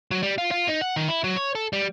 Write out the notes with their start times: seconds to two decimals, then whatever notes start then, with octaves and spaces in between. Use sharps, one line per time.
0.11 F#3
0.23 G3
0.38 F4
0.51 F4
0.68 D#4
0.81 F#5
0.96 D#3
1.08 E4
1.24 F#3
1.36 C#5
1.55 A4
1.73 G3